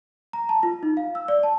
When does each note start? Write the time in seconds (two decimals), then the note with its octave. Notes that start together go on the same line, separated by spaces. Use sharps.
0.33 A#5
0.49 A5
0.63 F4
0.83 D#4
0.97 F5
1.15 E6
1.28 D5
1.43 A5